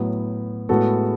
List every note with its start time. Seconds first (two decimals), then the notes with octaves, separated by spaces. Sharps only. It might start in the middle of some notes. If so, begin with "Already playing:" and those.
Already playing: A2 F#3 B3
0.69 A2 G#3 B3 F#4 A4